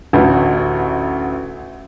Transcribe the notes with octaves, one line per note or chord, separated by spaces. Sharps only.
A1 D2